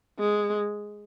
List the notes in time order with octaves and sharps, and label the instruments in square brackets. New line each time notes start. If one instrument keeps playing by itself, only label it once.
[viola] G#3